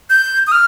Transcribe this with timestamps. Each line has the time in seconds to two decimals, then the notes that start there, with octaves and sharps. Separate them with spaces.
0.10 G6
0.47 D#6
0.52 F6